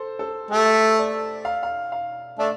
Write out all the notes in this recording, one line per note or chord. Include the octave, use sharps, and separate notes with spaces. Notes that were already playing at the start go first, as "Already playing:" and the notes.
Already playing: A4 C5
A4
A3 G4
D5
F5
F5
F5
A3 D4 D5